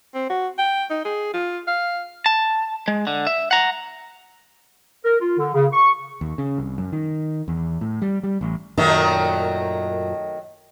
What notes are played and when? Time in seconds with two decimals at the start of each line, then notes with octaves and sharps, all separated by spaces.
0.15 C4
0.30 F#4
0.58 G5
0.90 D#4
1.05 G#4
1.34 F4
1.67 F5
2.26 A5
2.88 G#3
3.07 D3
3.27 E5
3.51 F#5 A#5
5.04 A#4
5.20 F4
5.38 D3
5.54 C#3
5.73 C#6
6.21 D#2
6.38 C#3
6.58 C2
6.78 F#2
6.92 D#3
7.48 E2
7.81 A2
8.02 G3
8.23 G3
8.41 A1
8.78 F#2 A#2 D#3 F#3 A3